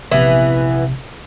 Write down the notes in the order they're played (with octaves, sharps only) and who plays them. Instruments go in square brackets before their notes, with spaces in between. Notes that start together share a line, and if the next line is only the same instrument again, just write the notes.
[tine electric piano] A#1 C3 [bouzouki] E3 B3